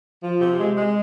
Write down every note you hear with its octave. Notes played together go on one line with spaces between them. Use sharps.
F3
C3
G#3
G#3